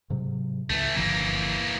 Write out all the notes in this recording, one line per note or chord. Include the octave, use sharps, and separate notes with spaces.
G#2 C3 F#3
C#2 E3 A3
G1 D3 E3 F3 A#3